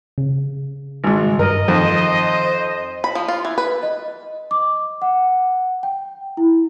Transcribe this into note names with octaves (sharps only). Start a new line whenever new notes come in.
C#3
G#1 G#2
G2 A#4 D#5
F2 D#3 C5
B5
F3
F4
E3
B4
D#5
D6
F#5
G5
E4